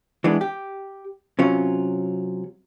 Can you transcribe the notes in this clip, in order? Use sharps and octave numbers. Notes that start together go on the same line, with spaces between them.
E3 G#3 B3 D4
G4
C3 F#3 C#4 F4